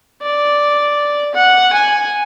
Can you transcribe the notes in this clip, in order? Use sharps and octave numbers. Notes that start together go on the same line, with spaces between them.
D5
F#5
G#5